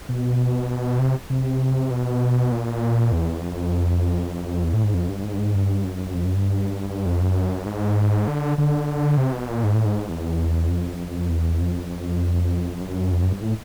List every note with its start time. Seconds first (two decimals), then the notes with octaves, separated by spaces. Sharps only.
0.09 B2
0.99 C3
1.30 C3
1.91 B2
2.52 A#2
3.12 E2
3.41 F2
4.64 E2
4.74 A2
4.84 G#2
4.94 F2
5.09 G2
5.23 G#2
5.33 G2
5.38 G#2
5.54 G2
5.84 F#2
6.14 F2
6.25 F#2
6.35 G2
7.06 F2
7.21 F#2
7.66 G#2
8.28 D3
8.58 D3
9.17 C3
9.33 B2
9.48 A#2
9.64 G#2
9.75 A2
9.85 G#2
10.09 E2
10.69 F2
11.29 E2
11.60 F2
12.81 F#2
13.12 F2
13.23 F#2
13.33 G2
13.42 A2